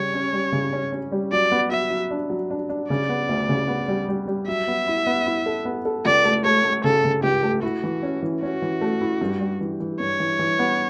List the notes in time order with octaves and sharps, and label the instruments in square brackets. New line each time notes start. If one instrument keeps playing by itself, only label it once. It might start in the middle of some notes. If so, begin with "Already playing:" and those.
Already playing: [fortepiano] C#3 G3 [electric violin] C#5
[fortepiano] C#4
G3
C#3
C#4
C#4
G3
[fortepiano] F#3 [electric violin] D5
[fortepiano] B3
[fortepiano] F#3 [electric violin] E5
[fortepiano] F#3
D4
F#3
D4
D4
[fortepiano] C#3 [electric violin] D5
[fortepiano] B3
D2
C#3
B3
G3
G3
G3
[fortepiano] F#3 [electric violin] E5
[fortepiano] B3
E4
B3
E4
A4
B3
A4
[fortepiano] C#2 [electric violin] D5
[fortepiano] A3
[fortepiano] A3 [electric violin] C#5
[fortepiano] A3
[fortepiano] C#3 [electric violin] A4
[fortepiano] C#3
[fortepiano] C#2 [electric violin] G4
[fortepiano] A3
[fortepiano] E4 [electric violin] F#4
[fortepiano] E3
C#4
E3
[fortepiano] C#4 [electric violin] F#4
[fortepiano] E3
A3
E4
G2
G3
E3
E3
[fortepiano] G2 [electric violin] C#5
[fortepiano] E3
E3
B3